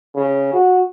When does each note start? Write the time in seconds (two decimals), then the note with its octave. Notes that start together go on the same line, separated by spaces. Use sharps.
0.15 C#3
0.53 F#4